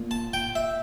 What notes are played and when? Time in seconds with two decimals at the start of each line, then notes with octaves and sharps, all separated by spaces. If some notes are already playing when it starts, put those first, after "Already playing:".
Already playing: A#2
0.11 A5
0.33 G5
0.56 E5